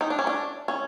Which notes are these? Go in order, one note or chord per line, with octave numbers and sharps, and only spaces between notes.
D#4
D4
C#4
D4
C#4